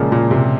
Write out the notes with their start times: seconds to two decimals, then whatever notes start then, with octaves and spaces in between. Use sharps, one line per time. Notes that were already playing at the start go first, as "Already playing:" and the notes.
Already playing: A#2 C#3 F3 G#3
0.12 A#2
0.31 C3